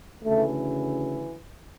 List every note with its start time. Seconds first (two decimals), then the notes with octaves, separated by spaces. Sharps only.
0.24 D2 C#3 E3 A3